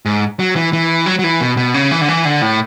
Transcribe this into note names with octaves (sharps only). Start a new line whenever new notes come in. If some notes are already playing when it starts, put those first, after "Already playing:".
G#2
F#3
E3
E3
F#3
F#3
E3
B2
B2
C#3
E3
D3
E3
D3
A2